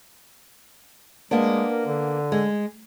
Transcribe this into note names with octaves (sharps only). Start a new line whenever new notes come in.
G#3 A#3 B3 D4
A#4
D3
G#3